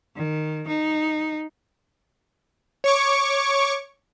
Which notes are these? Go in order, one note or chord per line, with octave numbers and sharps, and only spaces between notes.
D#3
D#4
C#5 C#6 D6